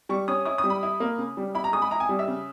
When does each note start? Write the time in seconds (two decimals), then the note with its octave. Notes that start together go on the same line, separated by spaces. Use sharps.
0.09 G3 C#6
0.28 C#4 D#6
0.45 E4 D#6
0.58 D#6
0.64 G3
0.70 B5
0.83 E4
1.00 A#3
1.18 C#3
1.37 G3
1.55 E4 B5
1.64 A#5
1.73 G#3 D#6
1.82 B5
1.91 E4 A#5
2.00 G#5
2.09 G3
2.19 E5
2.28 C#3